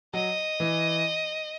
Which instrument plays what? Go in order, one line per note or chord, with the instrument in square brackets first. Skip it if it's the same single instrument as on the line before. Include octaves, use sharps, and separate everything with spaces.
[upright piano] F#3 [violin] D#5
[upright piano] E3